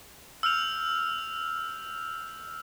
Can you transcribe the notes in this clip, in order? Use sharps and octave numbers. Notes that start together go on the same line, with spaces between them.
E6 F6 G6 F7